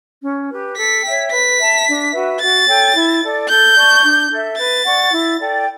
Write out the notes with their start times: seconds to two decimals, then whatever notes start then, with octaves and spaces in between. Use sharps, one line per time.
0.22 C#4
0.51 G4 B4
0.77 A4 B6
1.04 C#5 E5 G5
1.31 B4 B6
1.59 E5 A5
1.86 D4
2.13 F#4 B4 E5
2.40 F#4 A6
2.67 A4 C#5 G5
2.94 E4
3.21 A4 D5
3.48 A4 G6
3.76 D5 A5 C#6
4.03 D4
4.31 A4 E5
4.57 B4 A6
4.85 D5 F#5 C#6
5.12 E4
5.39 A4 D5 G5